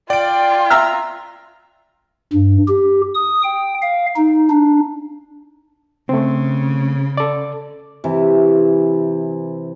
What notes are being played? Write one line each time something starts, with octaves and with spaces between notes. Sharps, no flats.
F4 D5 G5 D7
E5 A#5 F6
G2
G4
D#6
G5
F5
D#4
D4
C#3 A3 C4
A4 D5
C3 E3